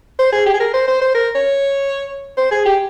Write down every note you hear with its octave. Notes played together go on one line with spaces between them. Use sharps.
C5
G#4
G4
G#4
A#4
C5
C5
C5
A#4
C#5
C5
G#4
G4